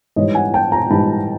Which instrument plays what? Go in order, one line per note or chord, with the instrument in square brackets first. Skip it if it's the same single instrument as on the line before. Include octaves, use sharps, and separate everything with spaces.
[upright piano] G#2 E3 G3 C#5 D#5
F#5 G#5
G5 A5
G#5 A#5
G#2 E3 G3 A5 B5